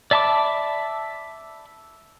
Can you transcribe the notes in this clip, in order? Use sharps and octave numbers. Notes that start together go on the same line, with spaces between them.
D5 E5 A5 B5 D6